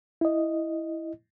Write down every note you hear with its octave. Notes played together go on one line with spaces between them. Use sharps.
E4 D#5